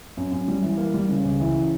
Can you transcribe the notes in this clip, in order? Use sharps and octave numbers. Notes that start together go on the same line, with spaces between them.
F#2
F#2
G3
E3
A#3
G3
C#3
C#2
E3
C#3